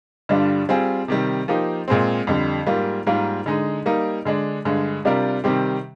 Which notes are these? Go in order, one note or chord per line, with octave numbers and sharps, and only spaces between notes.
G2 D3 G3 D4 F4
G3 C4 F4 G#4
C3 D#3 G3
F3 A#3 D#4 G4
A#2 G#3 C4
F2 D3 G3
G#2 G3 A#3 F4
G#2 G3 A#3 F4 A#4
D3 G#3 D#4
G3 A#3 D#4
D3 G#3 D4
G2 D3 G#3
C3 G3 D4 F4 A#4
C3 D#3 G3 C4 G4